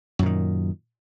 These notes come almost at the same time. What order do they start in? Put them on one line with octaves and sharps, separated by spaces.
F#2 A#2 D#3